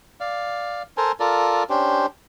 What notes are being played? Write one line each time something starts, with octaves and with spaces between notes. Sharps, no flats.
D5 F5
A4 A#4 C5 G#5
F4 A4 A#4 D5
C#4 D4 G4 C5